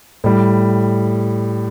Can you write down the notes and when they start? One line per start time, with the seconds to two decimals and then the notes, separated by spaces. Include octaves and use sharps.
0.24 A2 G3